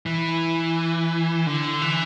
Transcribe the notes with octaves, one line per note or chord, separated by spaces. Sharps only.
E3
D3
E3